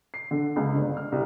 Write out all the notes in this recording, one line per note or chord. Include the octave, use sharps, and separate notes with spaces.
C7
D3
C#2
G1
F6
C2